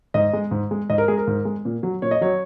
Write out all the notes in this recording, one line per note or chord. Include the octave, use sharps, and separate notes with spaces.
G#2 D#5
G#3
G#2
G#3
G#2 D#5
A#4
G#3 G#4
A#4
G#2
G#3
A#2
F#3
A#2 C#5
D#5
F#3 C#5